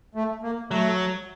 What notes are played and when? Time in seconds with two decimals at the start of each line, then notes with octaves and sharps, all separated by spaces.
0.15 A3
0.43 A#3
0.71 F#3 A3